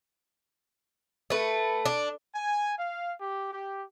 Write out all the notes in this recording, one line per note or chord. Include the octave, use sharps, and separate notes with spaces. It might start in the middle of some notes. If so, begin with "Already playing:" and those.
A3 B4
D4
G#5
F5
G4
G4